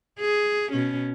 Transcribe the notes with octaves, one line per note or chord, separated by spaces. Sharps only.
G#4
B2 C#4